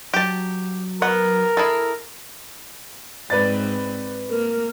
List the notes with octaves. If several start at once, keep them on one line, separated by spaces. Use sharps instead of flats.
F#3 G4 A5
B3 A#4 F#5
E4 G#4 A4
G#2 C4 B4 D5 A6
A#3 A#4